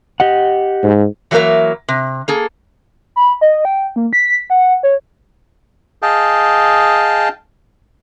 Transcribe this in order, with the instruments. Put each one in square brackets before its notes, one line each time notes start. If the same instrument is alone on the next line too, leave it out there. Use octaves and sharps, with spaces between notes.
[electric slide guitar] G4 D#5 F#5
[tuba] G#2
[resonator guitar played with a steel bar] E3 F#3 A3 A#3 A#4 E5
C3
A#3 G#4 A4
[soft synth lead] B5
D#5
G5
A#3
B6
F#5
C#5
[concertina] G#4 D#5 F5 G5 A5